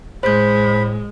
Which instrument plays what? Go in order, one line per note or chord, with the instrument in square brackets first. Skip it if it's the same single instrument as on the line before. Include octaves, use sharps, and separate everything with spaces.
[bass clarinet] A2 [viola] G#3 [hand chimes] C5 G6 [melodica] B5